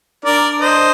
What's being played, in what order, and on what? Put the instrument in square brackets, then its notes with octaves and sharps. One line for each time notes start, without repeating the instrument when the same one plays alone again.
[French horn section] D4 [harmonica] A#4 D5
[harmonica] C5 D#5